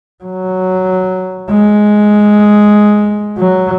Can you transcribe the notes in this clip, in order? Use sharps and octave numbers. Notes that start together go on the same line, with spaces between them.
F#3
G#3
F#3